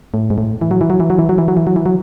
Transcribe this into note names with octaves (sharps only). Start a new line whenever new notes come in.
A2
G#2
A2
E3
F#3
E3
F#3
E3
F#3
E3
F#3
E3
F#3
E3
F#3
E3
F#3